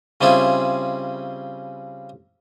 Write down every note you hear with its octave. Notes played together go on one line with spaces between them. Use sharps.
C#3 G3 C4 E4 F4 G#4